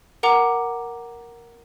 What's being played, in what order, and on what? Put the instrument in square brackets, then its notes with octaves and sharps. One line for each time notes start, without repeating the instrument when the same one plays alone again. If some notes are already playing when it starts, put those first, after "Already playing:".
[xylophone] A#4 F#5 A#5 D6